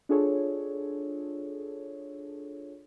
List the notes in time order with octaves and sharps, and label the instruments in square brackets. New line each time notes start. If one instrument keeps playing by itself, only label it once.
[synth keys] D4 F4 G#4 A4 C#5